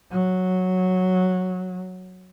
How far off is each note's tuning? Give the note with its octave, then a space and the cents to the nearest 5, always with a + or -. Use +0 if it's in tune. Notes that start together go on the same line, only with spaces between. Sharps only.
F#3 -5